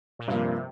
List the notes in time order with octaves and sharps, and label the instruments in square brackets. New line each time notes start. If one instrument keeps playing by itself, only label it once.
[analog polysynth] A#2
[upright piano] G2 F3 A#3 [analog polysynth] C3